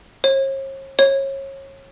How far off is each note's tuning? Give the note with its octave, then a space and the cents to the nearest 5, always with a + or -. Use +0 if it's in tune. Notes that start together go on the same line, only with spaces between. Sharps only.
C#5 -45
C#5 -30